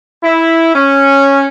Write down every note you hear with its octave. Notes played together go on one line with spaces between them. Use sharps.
E4
C#4